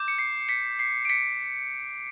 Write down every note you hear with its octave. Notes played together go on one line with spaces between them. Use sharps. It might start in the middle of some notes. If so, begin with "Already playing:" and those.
Already playing: D6 G6
C#7
C7
B6 C#7
C7
D7
B6 C#7